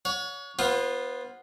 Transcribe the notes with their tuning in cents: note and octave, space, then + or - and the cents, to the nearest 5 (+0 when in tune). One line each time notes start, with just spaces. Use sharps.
C#5 +25 F#5 -35
B3 -10 F4 +0 C5 +30